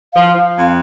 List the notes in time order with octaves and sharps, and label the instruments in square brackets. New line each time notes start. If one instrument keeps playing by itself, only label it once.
[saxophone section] F3 [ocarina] F5
[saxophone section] F3
F2